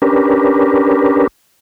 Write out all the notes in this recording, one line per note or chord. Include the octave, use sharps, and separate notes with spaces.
C#4 D4 G4 A#4 B4